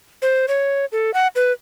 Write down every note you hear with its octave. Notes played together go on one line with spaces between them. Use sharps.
C5
C#5
A4
F#5
B4